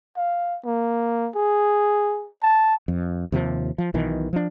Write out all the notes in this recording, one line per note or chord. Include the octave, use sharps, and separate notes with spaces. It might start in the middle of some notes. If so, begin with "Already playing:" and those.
F5
A#3
G#4
A5
F2
D#2 C3 D#3 F3
F3
B1 B2 D#3 E3
F3 D4